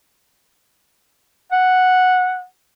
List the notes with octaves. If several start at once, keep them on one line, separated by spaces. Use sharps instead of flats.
F#5